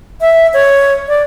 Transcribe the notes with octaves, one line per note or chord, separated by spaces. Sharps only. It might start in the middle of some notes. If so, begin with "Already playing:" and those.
E5
C#5
D5